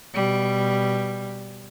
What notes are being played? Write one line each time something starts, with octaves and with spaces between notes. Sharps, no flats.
B2 G3